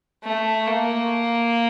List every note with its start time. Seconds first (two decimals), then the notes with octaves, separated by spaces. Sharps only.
0.24 A3
0.67 A#3